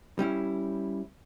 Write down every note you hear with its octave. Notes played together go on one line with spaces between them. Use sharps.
G3 C#4 E4